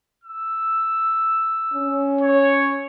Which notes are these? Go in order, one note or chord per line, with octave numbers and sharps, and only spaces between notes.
E6
C#4
C#5